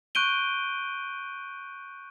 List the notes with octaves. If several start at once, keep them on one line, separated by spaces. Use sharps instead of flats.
C#6 F#6 G6 D7 D#7 G7